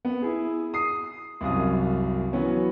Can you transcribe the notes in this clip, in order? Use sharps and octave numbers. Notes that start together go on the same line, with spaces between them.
B3
E4 G#4
D#6 C7
C2 F#2 F5 D#6
E3 F#3 B3 C#4